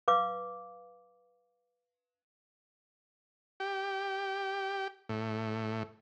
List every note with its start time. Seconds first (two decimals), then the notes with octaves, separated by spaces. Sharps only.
0.08 B4 F5 D6
3.60 G4
5.09 A2